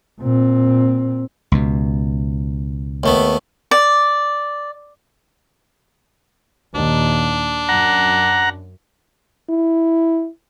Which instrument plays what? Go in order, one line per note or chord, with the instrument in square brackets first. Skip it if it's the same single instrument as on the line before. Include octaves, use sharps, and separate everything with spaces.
[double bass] A#2 C4
[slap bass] C#2 B2
[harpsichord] D#2 A3 B3
[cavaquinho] D5
[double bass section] D#2 A#2 [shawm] D4
[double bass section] F#2 [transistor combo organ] F#5 A#5
[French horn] E4